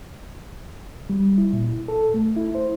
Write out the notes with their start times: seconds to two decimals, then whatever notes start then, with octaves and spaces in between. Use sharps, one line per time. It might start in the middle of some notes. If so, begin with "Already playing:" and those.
1.10 G3
1.38 E4
1.53 A#2
1.88 A4
2.14 A3
2.36 E4
2.55 C5